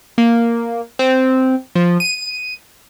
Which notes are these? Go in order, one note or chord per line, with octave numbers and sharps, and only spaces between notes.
A#3
C4
F3
D#7